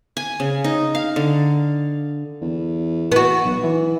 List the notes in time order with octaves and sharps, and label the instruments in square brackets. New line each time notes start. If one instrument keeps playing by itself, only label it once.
[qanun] G#5
C#3
D#4
F5
D3
[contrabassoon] E2
[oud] B3 F#4
[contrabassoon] B1
E3